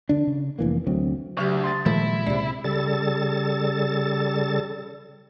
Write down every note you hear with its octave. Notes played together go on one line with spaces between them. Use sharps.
D3 D4
C#3
F1 E3 A#3
D2 F#3 C4
D2 C#3 F#3 G4
C6 D#6 A6
A#2 D#3 F3 G#3 A3 E4
C#2 C3 D5
C#3 G3 A4 A6